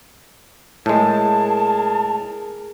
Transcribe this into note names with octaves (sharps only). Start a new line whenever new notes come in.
A2 G#3 G#4 A#4 A5